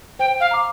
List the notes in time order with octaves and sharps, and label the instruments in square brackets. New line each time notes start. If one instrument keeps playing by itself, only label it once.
[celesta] C5 [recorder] G5
[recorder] F5
[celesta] A#5 D6